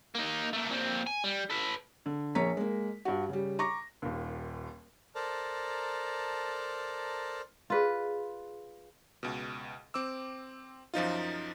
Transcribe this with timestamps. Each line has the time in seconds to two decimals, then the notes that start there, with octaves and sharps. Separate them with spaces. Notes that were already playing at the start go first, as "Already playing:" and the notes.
0.15 A#3 D#4
0.53 A3 A#3
0.71 A#2 C4
1.07 G#5
1.24 G3
1.50 A4 B4
2.06 D3
2.35 A#1 A#3 C#5 A#5 B6
2.57 G#3 A#3
3.05 G2 F#4
3.29 C#3 G3
3.59 A#5 C#6 D6 A#6
4.02 D#1 D#2
5.15 A4 A#4 C5 D5 A5 A#5
7.70 F4 G#4 B4 D5 D#5
9.23 C#2 B2
9.94 C4 D6 E6
10.94 F#2 F3 D#4 F4